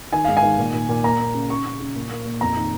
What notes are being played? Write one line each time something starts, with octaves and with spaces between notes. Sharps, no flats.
D#3 G#5
G#2 F5
G#5
D#3
A#2
A#2
A#2
A#3 A#5
A#3
C#3
C#3 C#6
C#3
C#3
A#2
A#3
A#2
F2 A#5
D#3